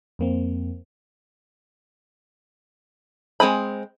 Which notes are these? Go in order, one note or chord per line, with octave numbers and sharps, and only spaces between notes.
F2 A#3 C4
G#3 C4 G#5 B5